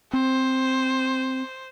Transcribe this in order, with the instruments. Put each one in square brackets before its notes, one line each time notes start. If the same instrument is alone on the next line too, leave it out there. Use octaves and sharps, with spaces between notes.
[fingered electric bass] C4 [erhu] C5